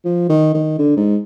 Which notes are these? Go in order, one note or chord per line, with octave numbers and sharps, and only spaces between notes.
F3
D#3
D#3
D3
G#2